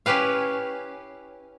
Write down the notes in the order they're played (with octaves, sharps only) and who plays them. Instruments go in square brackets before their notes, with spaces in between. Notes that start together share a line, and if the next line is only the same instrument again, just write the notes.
[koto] C#4 E4 G4 B4 F5